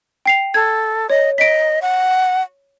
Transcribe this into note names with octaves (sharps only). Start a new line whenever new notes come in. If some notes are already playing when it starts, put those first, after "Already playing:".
G5 C7 F7
A4 G#6
C#5 D#5
D#5 B6 D7
F#5